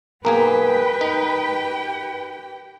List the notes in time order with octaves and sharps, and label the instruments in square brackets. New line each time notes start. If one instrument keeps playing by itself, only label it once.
[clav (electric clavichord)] B1 A#3 G#4 [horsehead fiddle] G4 G5 [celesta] A#4 A#5 [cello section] B4
[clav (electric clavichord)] D#4